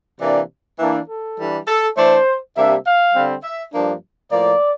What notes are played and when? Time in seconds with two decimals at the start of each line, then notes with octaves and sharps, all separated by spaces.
0.20 C3 E3 A#3 D4 D5
0.79 E3 A#3 D4
1.08 A4
1.37 E3 G3 D4
1.67 A4
1.96 E3 A3 D4 C5
2.55 C3 G3 A#3 D4 E5
2.85 F5
3.14 D3 G3 C4
3.43 E5
3.73 G2 F3 A#3 D4
4.31 A2 F3 A#3 D5